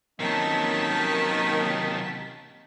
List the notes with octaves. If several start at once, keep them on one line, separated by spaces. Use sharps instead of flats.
C3 D#3 F#3 A#3 C#4 D#5 A5 B6